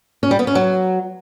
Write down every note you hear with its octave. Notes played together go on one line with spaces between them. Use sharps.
C#4
G3
B3
C#4
F#3